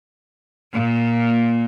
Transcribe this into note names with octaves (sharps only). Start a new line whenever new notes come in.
A#2